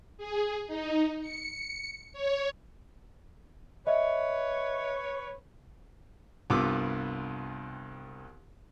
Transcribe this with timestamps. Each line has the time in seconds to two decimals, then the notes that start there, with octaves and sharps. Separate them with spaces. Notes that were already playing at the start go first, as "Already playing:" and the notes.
0.18 G#4
0.67 D#4
1.21 C#7
2.13 C#5
3.87 B4 C#5 D#5 E5
6.50 C2 G2 B3 F4 D6 E6